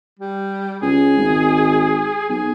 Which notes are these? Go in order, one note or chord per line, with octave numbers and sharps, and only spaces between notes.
G3
C#2 G#4
G#1
B1 G#4